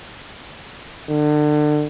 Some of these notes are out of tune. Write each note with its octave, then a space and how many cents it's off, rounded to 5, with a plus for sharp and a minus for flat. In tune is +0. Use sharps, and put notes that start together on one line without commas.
D3 +30